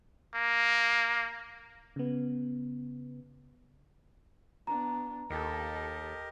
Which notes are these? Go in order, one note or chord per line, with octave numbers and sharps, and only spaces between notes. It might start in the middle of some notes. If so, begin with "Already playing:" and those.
A#3
C#3 B3
B3 D4 A#5
D#2 G4 A4 A#4 D#5